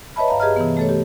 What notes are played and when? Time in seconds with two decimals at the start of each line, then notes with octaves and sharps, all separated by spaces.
0.16 B4 C#5 D#5 E5 A5 B5
0.28 G2 F5 A#5
0.40 G4 G#4 B4 D#5 A#5 F6
0.56 C3 E3 B3
0.77 A3 A4 C#5
0.89 G4